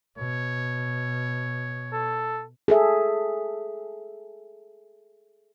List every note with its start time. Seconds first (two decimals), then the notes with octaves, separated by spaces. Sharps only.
0.18 B2 C#5
1.93 A4
2.68 G#4 A4 E5